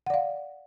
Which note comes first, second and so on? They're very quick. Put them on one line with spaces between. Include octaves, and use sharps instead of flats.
F#5 D5 F5